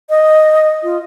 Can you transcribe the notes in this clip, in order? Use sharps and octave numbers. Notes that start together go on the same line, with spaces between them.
D#5
F4